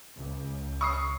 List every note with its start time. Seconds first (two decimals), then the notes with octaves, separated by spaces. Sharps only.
0.16 C#2
0.81 C#6 D#6 C7